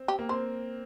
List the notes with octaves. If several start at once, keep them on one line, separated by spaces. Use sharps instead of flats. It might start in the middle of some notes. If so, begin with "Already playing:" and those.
Already playing: C4
G4
A#3
C4 C5